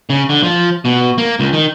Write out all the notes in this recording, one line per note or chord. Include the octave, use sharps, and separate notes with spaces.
C#3
D3
F3
B2
A#3
C#2
D#3